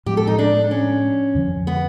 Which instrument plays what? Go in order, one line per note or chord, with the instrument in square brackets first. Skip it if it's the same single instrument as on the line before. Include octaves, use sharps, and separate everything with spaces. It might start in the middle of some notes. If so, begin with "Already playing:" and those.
[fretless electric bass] A2 F3 G#3 B3 [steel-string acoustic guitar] G4
[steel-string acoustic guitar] A4
D#4
D4
C#4
[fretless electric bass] F2 D3 F3
[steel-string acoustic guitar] B3